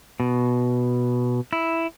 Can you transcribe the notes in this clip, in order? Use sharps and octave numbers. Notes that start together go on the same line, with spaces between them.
B2
E4